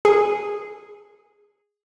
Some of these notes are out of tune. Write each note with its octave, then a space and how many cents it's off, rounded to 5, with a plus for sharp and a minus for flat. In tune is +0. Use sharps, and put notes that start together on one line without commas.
G#4 -10